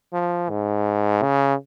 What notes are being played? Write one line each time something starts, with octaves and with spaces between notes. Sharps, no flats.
F3
G#2
C#3